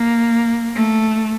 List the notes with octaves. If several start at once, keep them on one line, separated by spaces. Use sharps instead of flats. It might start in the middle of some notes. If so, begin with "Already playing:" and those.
Already playing: A#3
A3